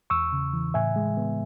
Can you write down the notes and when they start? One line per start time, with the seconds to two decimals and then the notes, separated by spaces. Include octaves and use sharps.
0.10 E2 C#6 E6
0.33 C#3
0.53 E3
0.74 A2 E5 G#5
0.96 G#3
1.17 B3